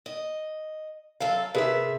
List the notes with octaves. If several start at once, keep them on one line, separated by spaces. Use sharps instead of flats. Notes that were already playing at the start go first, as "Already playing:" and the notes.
D#5
F#2 A4 F5
C3 G#4 A#4 B4 E5